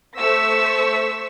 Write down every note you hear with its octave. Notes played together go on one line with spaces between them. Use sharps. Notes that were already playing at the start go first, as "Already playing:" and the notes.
A3 C5 C#6 E6 B6